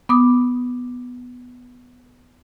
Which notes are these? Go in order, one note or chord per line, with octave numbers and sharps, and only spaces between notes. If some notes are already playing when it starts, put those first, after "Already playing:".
B3 D6 D#6